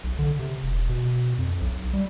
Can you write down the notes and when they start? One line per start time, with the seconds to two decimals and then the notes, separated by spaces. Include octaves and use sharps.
0.04 B1
0.19 D3
0.39 C3
0.63 E1
0.89 B2
1.38 F2
1.61 B1
1.93 G3